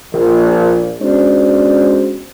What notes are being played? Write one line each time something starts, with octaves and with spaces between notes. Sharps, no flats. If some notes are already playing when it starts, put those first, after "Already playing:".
A#1
G#3 B3 C#4 D4 F#4 C5